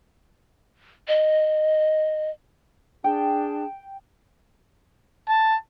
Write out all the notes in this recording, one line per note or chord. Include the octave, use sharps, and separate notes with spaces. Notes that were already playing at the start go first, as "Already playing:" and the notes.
D#5
D4 G#4 G5 A5
A5